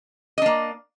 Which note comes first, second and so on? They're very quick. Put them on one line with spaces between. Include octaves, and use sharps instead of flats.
D#5 D4 A#3